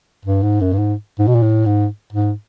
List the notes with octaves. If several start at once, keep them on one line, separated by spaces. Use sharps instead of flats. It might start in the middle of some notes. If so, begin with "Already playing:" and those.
G2
G#2
F#2
G2
G#2
G#2
B2
A#2
A2
G#2
G#2